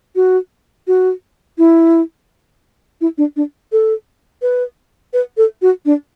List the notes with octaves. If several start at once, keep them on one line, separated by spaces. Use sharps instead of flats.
F#4
F#4
E4
E4
D4
D4
A4
B4
B4
A4
F#4
D4